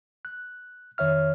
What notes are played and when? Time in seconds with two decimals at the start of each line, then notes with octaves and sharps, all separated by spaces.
0.25 F#6
0.98 F2 D#3 C#5 E5 F6